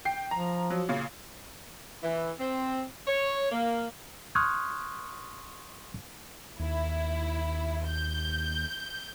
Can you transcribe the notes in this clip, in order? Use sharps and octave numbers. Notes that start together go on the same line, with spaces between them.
G5 C7
F3 A#5
F#3
A#2 C#3
E3
C4
C#5
A#3
C6 C#6 D#6 F6 F#6 G#6
D#2 E4
G6